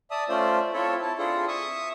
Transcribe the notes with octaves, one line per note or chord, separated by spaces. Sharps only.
D5 E5 A5 D#6
A3 C#4 F4 C5 D5 E5
C4 E4 F4 A4 C#5 E5
E4 A5
C4 D4 E4 F4 G#4 A4
E5 C#6 D#6